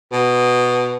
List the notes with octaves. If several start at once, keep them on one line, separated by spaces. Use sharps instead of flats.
B2